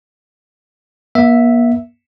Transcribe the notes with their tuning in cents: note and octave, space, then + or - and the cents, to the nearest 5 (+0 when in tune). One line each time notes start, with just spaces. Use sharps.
A#3 +45 E5 +0